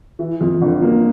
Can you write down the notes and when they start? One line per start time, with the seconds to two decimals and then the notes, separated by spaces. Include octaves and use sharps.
0.19 E3
0.41 F2
0.62 G1
0.82 A#3